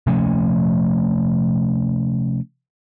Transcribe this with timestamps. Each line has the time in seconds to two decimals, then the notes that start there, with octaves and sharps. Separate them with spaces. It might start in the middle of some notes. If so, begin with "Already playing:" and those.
0.07 C3 F3 A3 C#4